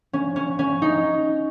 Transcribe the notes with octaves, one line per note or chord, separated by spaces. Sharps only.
C#4
C#4
C#4
D#4